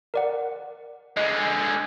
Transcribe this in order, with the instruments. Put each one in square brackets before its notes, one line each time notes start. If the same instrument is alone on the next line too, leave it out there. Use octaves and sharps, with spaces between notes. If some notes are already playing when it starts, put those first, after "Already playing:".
[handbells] A#4 D5 F#5
[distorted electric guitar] D3 G#3 [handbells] D#5 F#6